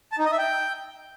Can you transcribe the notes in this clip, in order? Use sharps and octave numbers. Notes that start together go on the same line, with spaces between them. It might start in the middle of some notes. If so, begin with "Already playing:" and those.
A5
D#4
D#5
E5
G5